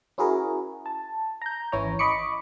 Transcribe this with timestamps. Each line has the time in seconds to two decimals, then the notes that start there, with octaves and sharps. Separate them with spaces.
0.18 C#4 E4 F#4 G#4 A#4
0.86 A5
1.42 A#5 G6
1.72 G#1 E3 C#4 E4 C#5 A#5
1.99 D#5 B5 C#6 D6 C#7